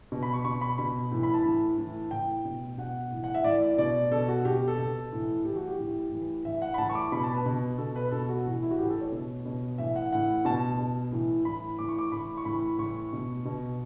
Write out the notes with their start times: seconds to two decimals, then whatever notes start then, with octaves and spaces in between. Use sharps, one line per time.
0.12 B2
0.23 B5
0.33 C#6
0.44 B2 C#6
0.61 B5
0.78 B2 B5
1.12 A2 E3
1.23 B5
1.34 A5
1.45 A2 E3
1.78 A2 E3
2.11 A2 E3 G5
2.45 B2
2.78 B2 F#5
3.11 A2 E3
3.24 F#5
3.35 E5
3.44 A2 E3 D5
3.62 D5
3.78 B2 D5
4.11 B2 A4
4.28 F#4
4.45 B2 G4
4.56 G4
4.68 A4
4.79 B2
5.12 A2 E3
5.45 A2 E3 G4
5.56 F#4
5.67 G4
5.78 A2 E3
6.12 A2 E3
6.45 A2 E3 E5
6.62 F#5
6.74 B5
6.78 A2 E3 A5
6.89 C#6
6.95 D6
7.12 B2 B5
7.23 A5
7.34 B4
7.46 B2
7.78 B2 A4
7.96 B4
8.12 B2 A4
8.29 F#4
8.45 A2 E3
8.62 E4
8.71 F#4
8.78 A2 E3 G4
8.90 A4
9.01 C#5
9.12 B2
9.45 B2
9.78 A2 E3 E5
9.96 F#5
10.12 A2 E3 F#5
10.45 B2 A5
10.78 B2
11.12 A2 E3
11.45 A2 E3 B5
11.78 A2 E3 D6
11.89 C#6
11.98 D6
12.12 A2 E3 B5
12.37 C#6
12.45 A2 E3 B5
12.78 A2 E3 C#6
13.13 B2
13.45 B2